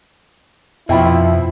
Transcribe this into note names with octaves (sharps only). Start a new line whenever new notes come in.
F2 B2 F3 E4 E5 G5 B5